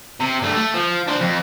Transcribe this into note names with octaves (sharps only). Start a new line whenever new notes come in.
C3
G2 A3
A3
F3
D4 C5
F2